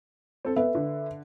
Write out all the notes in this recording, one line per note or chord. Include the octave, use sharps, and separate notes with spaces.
C4 A4
B3 A4 B4 E5
D3